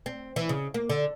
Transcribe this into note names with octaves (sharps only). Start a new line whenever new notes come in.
C4
E3
C#3
A#3
D3